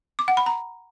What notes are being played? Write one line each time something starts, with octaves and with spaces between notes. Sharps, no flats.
D6
F#5
B5
A#5